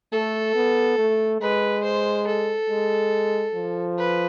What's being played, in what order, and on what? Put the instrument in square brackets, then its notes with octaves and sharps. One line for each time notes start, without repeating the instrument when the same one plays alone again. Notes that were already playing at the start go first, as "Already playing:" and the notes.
[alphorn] A3 [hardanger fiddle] A4
[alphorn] B3
A3
[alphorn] G#3 [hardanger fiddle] B4
[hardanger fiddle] C5
A4
[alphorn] G#3
F3
[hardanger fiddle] B4